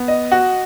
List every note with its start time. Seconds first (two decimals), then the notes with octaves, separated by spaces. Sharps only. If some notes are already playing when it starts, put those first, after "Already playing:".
Already playing: B3
0.08 D#5
0.32 F#4